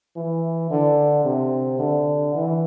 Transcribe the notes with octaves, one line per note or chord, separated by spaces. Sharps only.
E3
D3
C3
D3
E3